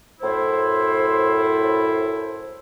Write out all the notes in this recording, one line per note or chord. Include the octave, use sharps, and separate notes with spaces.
F#2 A2 E4 C5